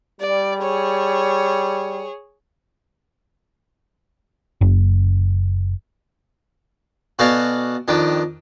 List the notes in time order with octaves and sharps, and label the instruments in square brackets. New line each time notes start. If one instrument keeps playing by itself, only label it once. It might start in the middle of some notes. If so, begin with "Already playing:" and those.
[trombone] G3 [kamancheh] D5
[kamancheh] G#4 C#5
[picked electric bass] F#1
[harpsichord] B2 F#4 A4 D5 F5 G#5
F2 D#3 D4 G5